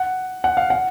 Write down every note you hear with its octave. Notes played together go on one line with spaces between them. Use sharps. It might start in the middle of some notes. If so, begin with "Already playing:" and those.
Already playing: F#5
F#5
F5
F#5